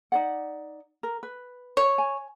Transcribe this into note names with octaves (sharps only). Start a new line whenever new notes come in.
D#4 D5 F#5
A#4
B4
C#5
G#5